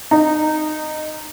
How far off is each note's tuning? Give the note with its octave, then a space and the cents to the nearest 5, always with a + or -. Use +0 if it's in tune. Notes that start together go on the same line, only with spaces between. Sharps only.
D#4 -20